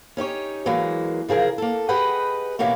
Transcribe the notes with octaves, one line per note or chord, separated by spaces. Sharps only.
C#4 D#4 G4 C#5
E3 F#3 G#3 A#3
C#3 F3 G#4 A#4
A#3 A4
G4 G#4 B4 D#5 F#5 G5
B2 E3 A#3 C#4 F#4 G4